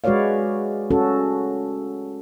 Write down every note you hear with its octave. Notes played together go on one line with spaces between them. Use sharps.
G#3 F#4 B4 C#5 D5 F5
C#4 F#4 A4